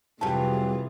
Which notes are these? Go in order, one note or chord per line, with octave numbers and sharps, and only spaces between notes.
F2 C3 E3 F#3 G3 F4 G#4 A5